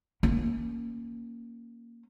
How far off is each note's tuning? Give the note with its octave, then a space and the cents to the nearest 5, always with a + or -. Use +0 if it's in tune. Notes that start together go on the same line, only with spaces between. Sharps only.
A#3 +0 C#4 +0